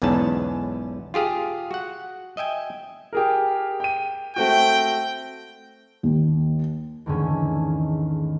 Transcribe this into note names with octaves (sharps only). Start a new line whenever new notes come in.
B1 E2 G#2 C#4 B4 A5
F4 G4 G#4 F5
F#4 F#5
D#5 E5 G5 G#5
G4 G#4 A#4
G5 D#7
A3 C4 F#4 G5
D#2
E2 G#2 D3 D#3 A3 C#4